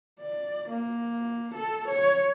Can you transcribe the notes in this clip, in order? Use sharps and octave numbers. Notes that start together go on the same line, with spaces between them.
D5
A#3
A4
C#5